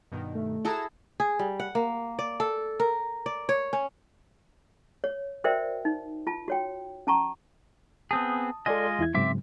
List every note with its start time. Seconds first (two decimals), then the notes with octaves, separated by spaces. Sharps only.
0.12 G2 B2 D#3
0.35 A3
0.65 E4 F#4 G#4 A4 A#5 E7
1.20 G#4
1.39 G3
1.60 F#5
1.75 A#3
2.19 D5
2.40 A4
2.80 A#4
3.26 D5
3.49 C#5
3.73 C#4
5.04 C#5
5.44 F#4 A#4 C5 D5 E5 G5
5.85 D#4
6.27 F4 A5
6.48 F#4 C#5 G5
7.07 C#4 A5 A#5 C#6
8.11 B3 C4 G#4 A5 D#6
8.66 G#3 F4 A4 D5 D#5 G#5
8.99 E2 E4 G#6
9.14 G#2 C#3 F#3 C4 E5 D6